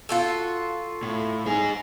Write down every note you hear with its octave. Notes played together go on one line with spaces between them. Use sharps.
F4 F#4 A4
A2
D#4 G#4